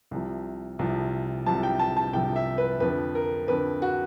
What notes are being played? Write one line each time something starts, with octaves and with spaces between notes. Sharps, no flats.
C2 C3 F3
C2 C3 F3
C2 C3 F3 A5
G5
A5
A5
C2 C3 F3 G5
E5
B4
F2 D3 F3 B4
A#4
F2 D3 F3 B4
F#4